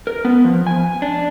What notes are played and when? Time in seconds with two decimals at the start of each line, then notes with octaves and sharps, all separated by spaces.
0.07 A#4
0.25 B3
0.44 F3
0.67 G#5
1.02 D4